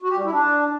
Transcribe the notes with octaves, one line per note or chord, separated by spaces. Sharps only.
F#4
G4
G3
E4
D4